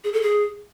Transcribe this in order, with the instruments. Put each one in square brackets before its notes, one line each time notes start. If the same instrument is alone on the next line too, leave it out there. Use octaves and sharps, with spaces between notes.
[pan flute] G#4
A4
G#4